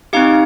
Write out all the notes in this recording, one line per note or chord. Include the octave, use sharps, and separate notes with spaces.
C4 D#4 G4 F5